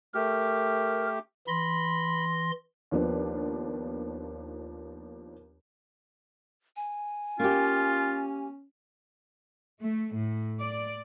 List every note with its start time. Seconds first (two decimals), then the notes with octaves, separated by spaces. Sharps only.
0.15 A3 G4 A#4
1.47 E3 B5 C6 A#6
2.91 D#2 F3 B3 D4
6.76 G#5
7.39 A#3 C#4 F4 G4
9.81 A3
10.15 A2
10.60 D5